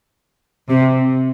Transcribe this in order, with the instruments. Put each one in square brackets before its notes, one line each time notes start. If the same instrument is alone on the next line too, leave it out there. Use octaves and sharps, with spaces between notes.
[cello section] C3